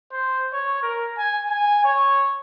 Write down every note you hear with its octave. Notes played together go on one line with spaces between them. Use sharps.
C5
C#5
A#4
G#5
G#5
C#5